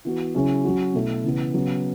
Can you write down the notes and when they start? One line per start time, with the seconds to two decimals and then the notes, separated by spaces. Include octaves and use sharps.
0.05 E3 B3 F#4
0.35 C#3 F#3 C#4 E4 G#4
0.65 F#3 C#4 F#4
0.94 B2 A3 E4
1.24 C#3 E3 B3
1.54 C#3 F#3 B3